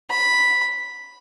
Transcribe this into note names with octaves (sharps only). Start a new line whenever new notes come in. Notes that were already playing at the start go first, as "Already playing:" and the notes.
B5